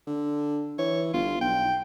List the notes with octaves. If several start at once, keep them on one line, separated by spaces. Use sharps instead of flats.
D3
E3 C#5
G1 F4
B1 G5